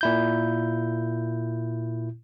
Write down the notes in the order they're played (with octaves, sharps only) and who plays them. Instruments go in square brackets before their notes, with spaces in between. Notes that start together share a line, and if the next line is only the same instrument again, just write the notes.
[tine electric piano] A#2 E4 G6